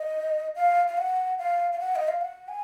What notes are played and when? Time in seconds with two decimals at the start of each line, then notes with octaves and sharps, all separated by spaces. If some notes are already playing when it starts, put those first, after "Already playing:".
Already playing: D#5
0.56 F5
0.88 F5
0.98 F#5
1.39 F5
1.72 F5
1.80 F#5
1.96 D#5
2.08 F5
2.21 F#5
2.48 G#5